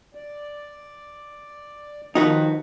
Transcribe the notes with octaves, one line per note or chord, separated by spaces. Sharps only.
D5
D#3 F3 D#4 F#4 B4